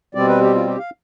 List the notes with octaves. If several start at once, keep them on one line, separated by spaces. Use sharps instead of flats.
B2 G3 C4 D5
B4
G4
F4
G4
F5